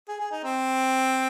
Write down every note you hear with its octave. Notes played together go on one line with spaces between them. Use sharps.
G#4
G#4
D#4
C4